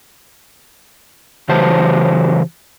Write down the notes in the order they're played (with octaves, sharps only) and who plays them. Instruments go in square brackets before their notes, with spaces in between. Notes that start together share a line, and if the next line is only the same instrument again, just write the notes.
[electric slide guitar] C#3 E3 F#3 G4 C5 A5